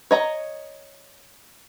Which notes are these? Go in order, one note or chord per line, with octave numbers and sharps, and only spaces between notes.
C#5 D#5 A#5